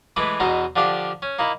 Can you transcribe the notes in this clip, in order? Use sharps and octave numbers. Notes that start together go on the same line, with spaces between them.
E3 G#3 A3 B4 D6
E2 B2 D#4 C5 A#5
D3 F3 D4 G4 F5
C#4
A#3 D#4 E4